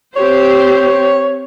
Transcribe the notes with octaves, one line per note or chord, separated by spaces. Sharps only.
C4 G4 C5 C#5